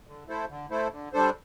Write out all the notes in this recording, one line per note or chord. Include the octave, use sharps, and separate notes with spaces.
D3
A3 E4 A4 C5
D3
A3 E4 A4 C5
D3
G3 D4 A4 C5